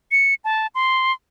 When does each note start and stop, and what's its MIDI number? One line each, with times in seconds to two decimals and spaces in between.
0.12 0.34 97
0.45 0.67 81
0.75 1.13 84